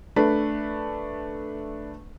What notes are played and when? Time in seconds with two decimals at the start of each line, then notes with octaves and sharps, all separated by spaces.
0.16 A3 D4 B4